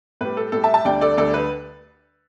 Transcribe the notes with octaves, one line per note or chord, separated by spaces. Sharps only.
A2 G3 B4
A4
A2 G3 A4
E5 A5
E5 A5
D2 D3 G3 D5 G5
A4 D5
D2 D3 G3 A4 D5
B4